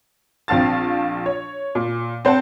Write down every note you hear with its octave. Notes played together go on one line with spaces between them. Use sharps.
A#1 C4 F5 A5 A6
C#5
A#2
C4 C5 F#5 A5